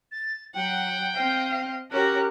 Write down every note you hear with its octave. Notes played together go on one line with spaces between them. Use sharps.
A6
F#3 F#5 G5
C4 D#5 F5
C#4 F#4 G4 A#4 F#6